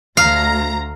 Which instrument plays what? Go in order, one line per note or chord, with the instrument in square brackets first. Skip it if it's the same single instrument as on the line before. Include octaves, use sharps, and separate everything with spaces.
[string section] D2 A#5 [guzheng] F5